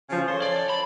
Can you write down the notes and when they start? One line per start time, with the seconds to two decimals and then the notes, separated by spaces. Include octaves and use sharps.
0.10 C#3 F3
0.27 A4 C5 C#5
0.42 D5
0.69 B5